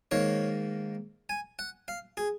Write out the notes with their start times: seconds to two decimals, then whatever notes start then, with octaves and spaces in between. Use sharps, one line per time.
0.11 G#2 D#3 A#3 C#5
1.29 G#5
1.59 F#5
1.88 F5
2.17 G#4